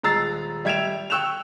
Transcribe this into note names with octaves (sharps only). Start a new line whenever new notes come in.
D#1 G#3 A#5 E6 A6 C7
G3 E5 G#6 D7 E7 F7
G5 C#6 E6 F#6 E7 F7